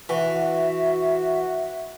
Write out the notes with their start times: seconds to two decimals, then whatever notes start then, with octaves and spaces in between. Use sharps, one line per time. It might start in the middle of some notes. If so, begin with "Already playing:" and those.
0.09 E3 F#4 E5